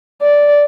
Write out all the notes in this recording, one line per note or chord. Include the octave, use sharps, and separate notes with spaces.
D5